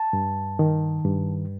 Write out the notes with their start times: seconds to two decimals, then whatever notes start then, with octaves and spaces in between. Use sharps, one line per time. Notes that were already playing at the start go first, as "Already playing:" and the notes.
Already playing: A5
0.13 G2
0.59 D#3
1.05 G2